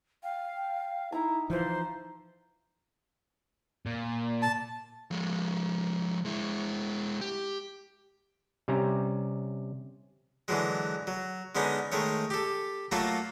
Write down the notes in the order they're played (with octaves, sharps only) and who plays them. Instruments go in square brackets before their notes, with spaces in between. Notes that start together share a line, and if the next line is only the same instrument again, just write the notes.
[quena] F5 [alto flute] G5
[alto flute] G5
[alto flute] D#4 [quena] E4 [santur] A#5
[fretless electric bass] E3 F3 [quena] C5
[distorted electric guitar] A#2
[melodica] A5
[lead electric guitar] F3 G#3
G#3 E4
G4
[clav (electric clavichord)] C3 G3 C#4 A#5
[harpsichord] D3 E3 F#3 G#3
F#3
D3 G#3 B3 C#4 D#4
D#3 G#3 A3 C#5
G4 A4
F#3 A3 A#3 F4 A4